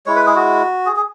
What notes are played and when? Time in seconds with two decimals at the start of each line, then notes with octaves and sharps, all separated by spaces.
0.06 G#3 E4 C#5
0.16 B4
0.26 G#4
0.36 F#4
0.86 G#4
0.96 G#4